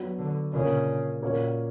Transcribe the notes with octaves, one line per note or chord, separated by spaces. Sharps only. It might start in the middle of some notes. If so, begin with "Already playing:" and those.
Already playing: F#3 B3 D4 F#4
D3
A#2 C#3 A#3 D4
A#2 A#3 C#4 F#4 C#5